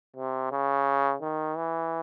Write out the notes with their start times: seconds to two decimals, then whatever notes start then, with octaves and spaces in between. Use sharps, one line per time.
0.16 C3
0.52 C#3
1.22 D#3
1.57 E3